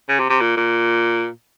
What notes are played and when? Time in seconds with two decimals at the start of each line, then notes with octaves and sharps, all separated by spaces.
0.09 C#3
0.19 C3
0.30 C3
0.41 A#2
0.57 A#2